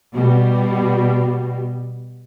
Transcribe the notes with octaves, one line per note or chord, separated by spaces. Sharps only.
B2 G3